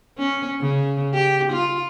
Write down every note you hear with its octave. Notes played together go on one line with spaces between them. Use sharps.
C#4
C#3
G4
F4